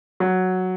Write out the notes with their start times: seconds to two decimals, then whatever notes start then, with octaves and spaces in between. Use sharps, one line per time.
0.20 F#3